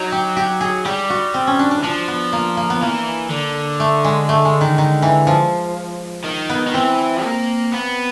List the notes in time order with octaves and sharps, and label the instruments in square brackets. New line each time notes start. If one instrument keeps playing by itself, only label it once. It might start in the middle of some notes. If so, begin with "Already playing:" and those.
Already playing: [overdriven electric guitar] F#3 [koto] D#4
[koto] G4
G4
G#4
[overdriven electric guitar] G3 [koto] G4
[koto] F#4
C4
C#4
D4
D4
[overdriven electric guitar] E3
[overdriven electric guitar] F3 [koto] D4
[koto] B3
A#3
A#3
B3
[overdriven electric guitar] E3 [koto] A#3
[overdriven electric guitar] D3
[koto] A3
G#3
A3
G#3
D#3
D#3
E3
F3
[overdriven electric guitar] D#3
[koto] B3
[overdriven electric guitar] D#3
[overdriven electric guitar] E3 [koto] C4
[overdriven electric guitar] A#3
B3